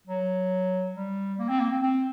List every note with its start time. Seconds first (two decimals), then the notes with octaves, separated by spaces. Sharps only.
0.07 F#3
0.94 G3
1.39 A#3
1.49 C4
1.60 A#3
1.71 C4
1.83 C4